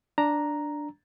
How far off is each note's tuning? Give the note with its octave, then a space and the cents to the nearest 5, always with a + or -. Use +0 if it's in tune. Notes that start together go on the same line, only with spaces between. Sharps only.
D4 +0 A#5 +0